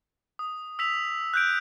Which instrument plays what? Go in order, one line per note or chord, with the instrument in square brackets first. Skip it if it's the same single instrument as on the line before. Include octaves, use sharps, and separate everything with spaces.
[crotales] D#6
E6 B6 F7
F#6 G6 D7